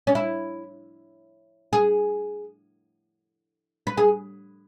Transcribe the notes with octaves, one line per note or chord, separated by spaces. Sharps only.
C#4
E4
G#4
B4
G#4